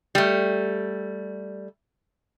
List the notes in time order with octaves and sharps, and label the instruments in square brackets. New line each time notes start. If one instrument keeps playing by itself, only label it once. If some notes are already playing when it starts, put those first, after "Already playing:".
[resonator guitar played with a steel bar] G3 A3